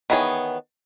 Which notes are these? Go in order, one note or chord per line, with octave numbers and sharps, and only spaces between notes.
D#3 E3 B3 G#4 C#5